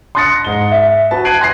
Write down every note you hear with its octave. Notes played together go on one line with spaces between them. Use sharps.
C6 D#6 F#6 A6 A#6 C#7
G#2 G7
E5
F#4 B4 A5
F#6 G#6 C7 D7 D#7 F#7
G#5 C6 A#6 C7